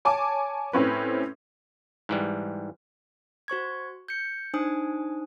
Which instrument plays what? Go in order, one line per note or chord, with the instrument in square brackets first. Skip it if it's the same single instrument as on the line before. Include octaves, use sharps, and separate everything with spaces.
[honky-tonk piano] C#5 G#5 A5 D6
A2 C4 C#4 B4
[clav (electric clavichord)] G#2 E3 G3
[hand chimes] F#4 C5 C#6 G#6
G6 C#7
D4 D#4 C5 G#5 D#6